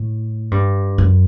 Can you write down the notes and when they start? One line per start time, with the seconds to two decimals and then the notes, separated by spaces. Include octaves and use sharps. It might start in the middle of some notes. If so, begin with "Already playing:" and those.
Already playing: A2
0.51 G2
0.98 F#2